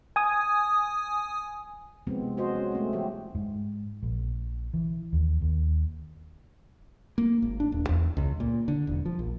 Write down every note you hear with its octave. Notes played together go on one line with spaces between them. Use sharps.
G#5 D#6
C3 D#3 F3 G#3 B3 C4
F#4 G#4 C5 D#5
C#4
A3 C4
E3 F3 G3 G4
G#2
A#1
E3
D#2
D#2
A#3
G#1
D4
D#1
E2
C#2
A#2
D3
E1
F3
A#1